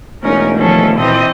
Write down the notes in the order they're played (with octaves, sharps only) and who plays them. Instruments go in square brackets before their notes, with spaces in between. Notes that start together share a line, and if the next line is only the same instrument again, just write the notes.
[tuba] E1 [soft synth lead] A3 [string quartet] C#4 [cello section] D#4 A#4
[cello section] D#3 F3 [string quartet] C#4 A4
[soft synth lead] A#2 [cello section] E3 [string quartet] C4 D#5 D#6